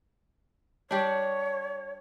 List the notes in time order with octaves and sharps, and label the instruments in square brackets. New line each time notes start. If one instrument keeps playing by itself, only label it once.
[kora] G3 D4 [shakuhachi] C#5